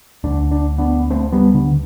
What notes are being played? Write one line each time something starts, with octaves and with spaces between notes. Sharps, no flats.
D2 D3 D4
D4
B3 D4
A3 C4
G3 B3
D3